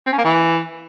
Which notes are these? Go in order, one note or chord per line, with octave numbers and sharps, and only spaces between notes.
C4
C#4
A#3
E3